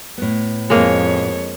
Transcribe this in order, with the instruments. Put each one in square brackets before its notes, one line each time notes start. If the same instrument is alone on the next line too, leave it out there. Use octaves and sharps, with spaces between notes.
[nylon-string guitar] A2 B3
[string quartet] F2 C#5 [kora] G#3 A#3